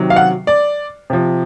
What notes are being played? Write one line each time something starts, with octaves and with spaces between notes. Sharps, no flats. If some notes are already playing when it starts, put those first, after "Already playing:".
Already playing: C3 D#3 F#3
F5
F#5
D5
C3 F3